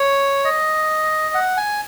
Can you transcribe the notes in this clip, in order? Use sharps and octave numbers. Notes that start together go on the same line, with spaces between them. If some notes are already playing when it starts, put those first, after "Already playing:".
Already playing: C#5
D#5
F#5
G#5